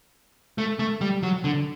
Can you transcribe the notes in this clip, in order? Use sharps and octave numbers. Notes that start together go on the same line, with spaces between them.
A3
A3
G3
F#3
D3